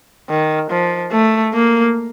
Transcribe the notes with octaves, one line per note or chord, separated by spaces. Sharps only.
D#3
F3
A3
A#3